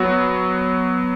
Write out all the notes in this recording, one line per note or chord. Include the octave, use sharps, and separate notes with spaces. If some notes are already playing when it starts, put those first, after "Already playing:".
Already playing: F#3 B3 F#4